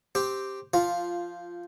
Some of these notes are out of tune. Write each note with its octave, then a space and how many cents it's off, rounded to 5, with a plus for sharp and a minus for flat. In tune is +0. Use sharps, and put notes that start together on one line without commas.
C4 +0 G4 +0
F3 -10 F4 +0